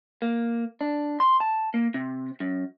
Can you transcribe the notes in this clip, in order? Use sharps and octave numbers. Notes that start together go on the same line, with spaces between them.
A#3
D4
C6
A5
A#3
C3
F#2